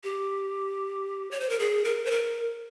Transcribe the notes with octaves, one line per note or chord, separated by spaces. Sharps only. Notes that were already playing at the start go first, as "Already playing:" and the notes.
G4
C#5
C5
A#4
G#4
A#4
C5
A#4